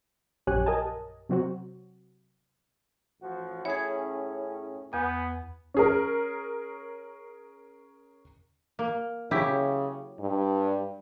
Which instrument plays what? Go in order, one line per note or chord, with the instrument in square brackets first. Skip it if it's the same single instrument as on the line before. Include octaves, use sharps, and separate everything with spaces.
[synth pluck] A#1 F#2 G4 C#5 G#5 F#6
G4 A#4 D#5 G#5 A5
C3 F#3 C4 F#4
[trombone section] A1 F3 F#4
[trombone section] A2 C#4 [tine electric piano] E4 G#4 [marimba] C#5 G#6
[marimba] E2 D#6 [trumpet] B3 [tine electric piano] G#5
[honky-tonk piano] C#4 G#4 A#4
[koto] A#3
[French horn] C#3 [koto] F#3 E4 G4
[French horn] G2